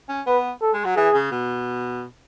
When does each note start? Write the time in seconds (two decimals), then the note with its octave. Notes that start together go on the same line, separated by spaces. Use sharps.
0.09 C#4
0.27 B3 B4
0.62 A4
0.74 G#3
0.85 F#3
0.96 E3 G#4
1.14 C#3
1.31 B2